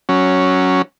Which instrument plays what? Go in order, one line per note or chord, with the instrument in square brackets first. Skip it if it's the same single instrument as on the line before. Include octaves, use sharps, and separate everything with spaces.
[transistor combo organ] F#3 C#4